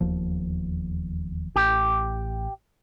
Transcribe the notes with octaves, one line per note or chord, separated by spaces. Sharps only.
E1 D#2 F3
A1 G4